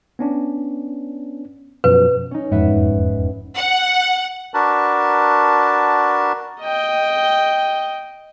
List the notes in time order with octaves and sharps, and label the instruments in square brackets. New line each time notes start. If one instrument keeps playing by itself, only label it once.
[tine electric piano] B3 C#4 D4
[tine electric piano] F#2 B2 F3 [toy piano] B4
[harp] C#4 D#4
[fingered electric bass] E1 F2 G#2 [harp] B4 E5 F#5
[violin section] F#5
[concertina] D4 F#4 A#4 B4 A5
[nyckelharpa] D#5 G5